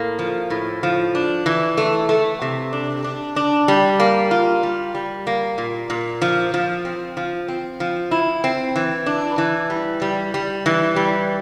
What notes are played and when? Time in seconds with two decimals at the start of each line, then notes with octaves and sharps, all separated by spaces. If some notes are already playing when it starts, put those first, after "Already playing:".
Already playing: A2 A#3
0.19 F3
0.50 A2
0.83 F3
1.15 D4
1.46 E3
1.77 A3
2.09 A3
2.42 C3
2.73 D4
3.04 D4
3.36 D4
3.68 G3
4.00 A#3
4.31 F4
4.63 G3
4.95 G3
5.27 A#3
5.58 A#2
5.90 A#2
6.22 F3
6.54 F3
6.85 C4
7.17 F3
7.48 C4
7.80 F3
8.11 E4
8.44 C4
8.76 E3
9.06 D4
9.38 E3
9.70 G3
10.02 G3
10.34 G3
10.66 E3
10.96 G3